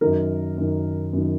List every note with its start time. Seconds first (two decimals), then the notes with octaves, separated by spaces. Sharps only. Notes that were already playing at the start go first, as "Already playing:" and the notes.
0.01 F#2 D#3 A#4
0.58 F#2 D#3
1.13 F#2 D#3